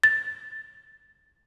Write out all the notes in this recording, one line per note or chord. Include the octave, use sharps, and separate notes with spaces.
A6